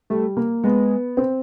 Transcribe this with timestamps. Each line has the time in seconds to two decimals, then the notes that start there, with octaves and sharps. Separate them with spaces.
0.10 G3 A3
0.37 A#3
0.64 G#3 B3
1.17 C4